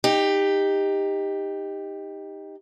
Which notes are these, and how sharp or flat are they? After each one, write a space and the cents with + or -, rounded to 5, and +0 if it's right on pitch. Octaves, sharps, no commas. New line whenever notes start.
D#4 +0 G4 +15